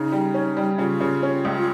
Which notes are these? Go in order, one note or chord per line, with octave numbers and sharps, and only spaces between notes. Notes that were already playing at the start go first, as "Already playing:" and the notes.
Already playing: C#3 D#4
G3
C#4
G3
C#3 F4
C#3
C#4
C#2